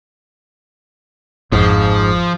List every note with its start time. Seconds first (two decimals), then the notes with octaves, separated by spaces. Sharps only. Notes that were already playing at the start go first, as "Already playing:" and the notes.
1.52 G#1 F2 G#2 F3